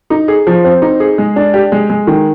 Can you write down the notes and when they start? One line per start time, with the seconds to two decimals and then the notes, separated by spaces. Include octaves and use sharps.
0.10 D#4
0.28 G#4
0.47 F3
0.64 C4
0.82 D#4
1.00 G#4
1.18 G#3
1.36 D4
1.54 G4
1.72 G#3
1.90 G#3
2.07 D#3